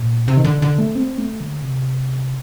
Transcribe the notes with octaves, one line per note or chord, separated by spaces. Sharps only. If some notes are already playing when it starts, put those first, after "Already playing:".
Already playing: A#2
C3
D#3
D3
D3
A3
C4
A3
D3
C3